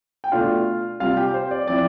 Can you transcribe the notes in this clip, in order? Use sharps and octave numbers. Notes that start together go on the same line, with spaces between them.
G5
B2 A3 D4 F4 F5
C3 G3 C4 F4 F5
G4 G5
C5
D5
F3 C4 E4 D5